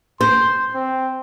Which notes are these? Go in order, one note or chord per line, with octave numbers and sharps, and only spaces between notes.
C5 C6
C4